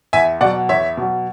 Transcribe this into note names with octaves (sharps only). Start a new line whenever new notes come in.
E2 E5 G#5
B2 F#3 D5 F#5
E2 C#5 E5
B2 F#3